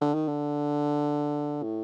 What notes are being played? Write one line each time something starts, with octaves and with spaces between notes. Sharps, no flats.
D3
D#3
D3
A2